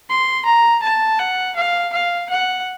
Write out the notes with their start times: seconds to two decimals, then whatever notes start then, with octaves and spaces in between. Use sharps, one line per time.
0.10 C6
0.45 A#5
0.83 A5
1.19 F#5
1.56 F5
1.93 F5
2.29 F#5